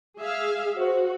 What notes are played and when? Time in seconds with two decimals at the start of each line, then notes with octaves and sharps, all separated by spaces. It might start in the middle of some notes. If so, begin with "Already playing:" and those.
0.20 G#4 E5 F5
0.77 F#4 C5